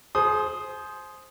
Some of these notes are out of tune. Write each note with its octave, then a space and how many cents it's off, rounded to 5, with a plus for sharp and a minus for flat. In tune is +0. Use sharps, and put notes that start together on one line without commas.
G#4 +40 C5 +0 D#6 +0